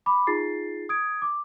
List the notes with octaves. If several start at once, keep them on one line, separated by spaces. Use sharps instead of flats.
B5 D6
D#4 F4 G#4 A6 C7
D#6 G#6 D7
D6